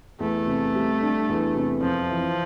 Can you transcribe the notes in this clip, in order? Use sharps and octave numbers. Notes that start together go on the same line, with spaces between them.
E2 A3
C3
G3
D4
E2
C3
F2 F3
E3